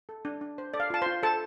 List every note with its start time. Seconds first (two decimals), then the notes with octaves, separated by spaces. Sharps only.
0.09 A4
0.25 D4
0.41 D4
0.58 C5
0.74 A4 D5
0.80 F5
0.90 F4 A5
1.02 F4 C5 C6
1.23 A4 C5 A5